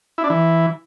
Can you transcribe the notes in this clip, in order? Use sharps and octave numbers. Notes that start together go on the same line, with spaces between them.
E4
D4
E3